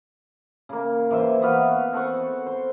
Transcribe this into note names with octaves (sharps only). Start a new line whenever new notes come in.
C#3 A#3
E3 G4 C5 E5
B3 F#4 B4 F5
C4 A4 F#5 C#6
C5